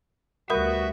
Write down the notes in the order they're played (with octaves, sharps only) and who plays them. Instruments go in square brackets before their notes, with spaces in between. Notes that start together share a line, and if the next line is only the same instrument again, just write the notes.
[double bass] D2 G3 [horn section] B3 F#4 [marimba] A#4 B5 D#6 [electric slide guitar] E5